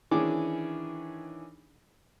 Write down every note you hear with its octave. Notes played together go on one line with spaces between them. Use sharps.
D#3 E3 C#4 D4 G#4 D6